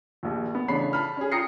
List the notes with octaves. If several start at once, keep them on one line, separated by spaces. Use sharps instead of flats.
A#1 D#2
B3
A1 C#3 D4 C#5 B5 C7
A5 B5 F6
C#4 G#4
G5 A#5 D#6 A#6 C7 C#7